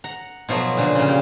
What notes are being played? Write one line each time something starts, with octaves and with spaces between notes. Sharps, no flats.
F#5 A#5
B2 F3 F#3 A3
A#2 D3 F3
A#2 C#3
G4